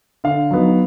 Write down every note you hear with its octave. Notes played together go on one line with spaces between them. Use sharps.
D3 F5
F#3 B3 D#4